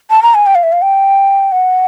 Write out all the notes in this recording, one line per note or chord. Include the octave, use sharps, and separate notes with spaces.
A5
A#5
G#5
G5
F5
E5
F5
G5
F#5